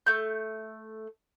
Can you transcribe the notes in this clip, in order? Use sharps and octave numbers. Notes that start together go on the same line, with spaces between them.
A3 G6